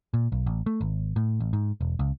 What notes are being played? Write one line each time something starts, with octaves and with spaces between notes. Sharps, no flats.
A#2
B1
A1
A3
G#1
A2
A1
G#2
E1
C#2